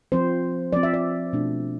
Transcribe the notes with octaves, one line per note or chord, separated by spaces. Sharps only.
F3 C4 C5
F3 C4 D5
E5
D5
B2 A3 D4